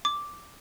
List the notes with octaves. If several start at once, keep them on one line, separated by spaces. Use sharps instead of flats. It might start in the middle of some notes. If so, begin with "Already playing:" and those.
D6